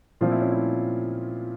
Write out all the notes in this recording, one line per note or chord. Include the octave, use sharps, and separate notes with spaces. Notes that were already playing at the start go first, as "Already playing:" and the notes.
A#2 F3 C4 F4
E4
C#4
E4